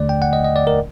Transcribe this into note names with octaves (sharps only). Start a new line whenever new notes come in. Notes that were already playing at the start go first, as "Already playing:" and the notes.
Already playing: D#2 D3 A3 D5
G5
F#5
D#5
D#5
D5
A#4